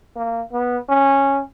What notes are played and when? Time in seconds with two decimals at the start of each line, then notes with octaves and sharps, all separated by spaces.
0.16 A#3
0.52 B3
0.89 C#4